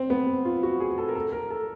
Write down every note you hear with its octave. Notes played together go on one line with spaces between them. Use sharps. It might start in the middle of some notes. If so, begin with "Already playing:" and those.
Already playing: C4
B3
F4
F#4
G#4
A4
A#4
A4
A#4
A4